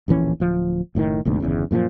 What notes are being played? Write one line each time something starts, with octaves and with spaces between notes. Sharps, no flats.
D1 A#1 E3 C#4
D1 F3
F#1 A2 D3 D#3
F1 D2 G#2 B2
G1 E2 C#3
F#2 A#2 C#3 F3